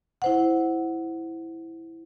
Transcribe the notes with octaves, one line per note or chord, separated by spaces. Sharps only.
E4 C5 F#5